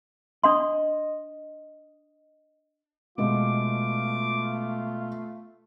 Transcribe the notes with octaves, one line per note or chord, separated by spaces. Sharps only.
D4 D#5 C6
B2 G#3 A3 B3 F4 D6